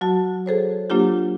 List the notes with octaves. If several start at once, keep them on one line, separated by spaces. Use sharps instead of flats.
F#3 F#4 A5
G#4 A4 C5 C#5
F#3 A#3 D4 F4 G4